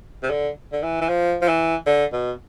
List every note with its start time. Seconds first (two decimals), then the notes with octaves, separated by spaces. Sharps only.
0.23 C3
0.31 D3
0.72 D3
0.83 E3
1.01 E3
1.09 F3
1.42 F3
1.48 E3
1.87 D3
2.13 B2